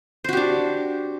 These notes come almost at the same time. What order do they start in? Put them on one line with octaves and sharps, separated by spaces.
C5 F#4 G4 D4